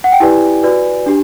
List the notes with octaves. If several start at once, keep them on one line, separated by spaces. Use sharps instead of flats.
F#5
G5
E4 G4 B4 D5 G#5
F#4 B4 D5
D4 G4